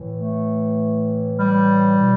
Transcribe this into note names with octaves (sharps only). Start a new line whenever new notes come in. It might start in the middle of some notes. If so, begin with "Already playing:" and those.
Already playing: A2 E3
A3
G3
B2